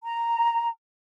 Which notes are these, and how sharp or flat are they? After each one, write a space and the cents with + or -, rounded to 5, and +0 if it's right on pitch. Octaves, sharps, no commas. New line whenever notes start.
A#5 -5